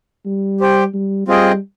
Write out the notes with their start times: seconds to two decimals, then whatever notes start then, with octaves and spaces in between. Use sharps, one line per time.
0.26 G3
0.60 G4 C5 G5
0.94 G3
1.27 G3 C4 F4 G#4 D#5 G5